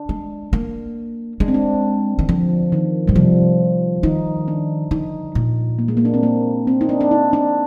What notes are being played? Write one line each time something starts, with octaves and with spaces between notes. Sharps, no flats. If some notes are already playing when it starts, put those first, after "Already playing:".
Already playing: D4
G#3
A#3
G#3 D4
C4
D4
D#3
D3 F3
D#3
A#2 G3
C3 F3
D#3 D#4
D4
D3 D#4
A#2
A#3
G#3
A#3
D4
C4
A#3
C4
D#4
D4
D4
D#4
D4